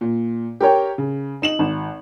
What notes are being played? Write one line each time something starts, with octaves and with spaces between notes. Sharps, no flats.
A#2
G4 A#4 C#5 G5
C#3
D#4 E7 F#7
G#1